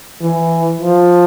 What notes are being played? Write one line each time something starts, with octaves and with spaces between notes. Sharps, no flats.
E3
F3